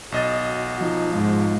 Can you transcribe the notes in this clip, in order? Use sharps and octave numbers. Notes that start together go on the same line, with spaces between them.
B1 F#4 D#5 A6
F3 D#4
G#2 F4